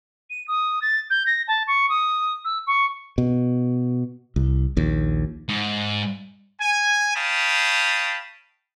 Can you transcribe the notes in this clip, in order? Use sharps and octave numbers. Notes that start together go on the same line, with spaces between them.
D#7
D#6
A6
G6
A#6
A5
C#6
D#6
E6
C#6
B2
C2
A#1 D#2
G#2
G#5
C#5 F5 G5 A5 B5 D#6